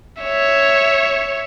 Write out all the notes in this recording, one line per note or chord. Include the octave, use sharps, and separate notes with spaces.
C#5 E5